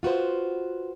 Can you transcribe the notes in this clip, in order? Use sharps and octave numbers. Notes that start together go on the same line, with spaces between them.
F4 F#4 B4 C5